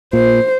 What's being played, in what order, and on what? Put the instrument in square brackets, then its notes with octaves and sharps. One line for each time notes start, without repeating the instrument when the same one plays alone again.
[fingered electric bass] A#2 [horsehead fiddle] C5